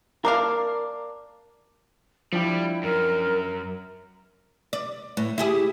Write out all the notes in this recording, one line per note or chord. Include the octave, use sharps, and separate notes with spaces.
A#3 D4 A#4 F5
F3 G3 D4 E4 G5
F#2 A#4
D5
A2
E4 G4 G#4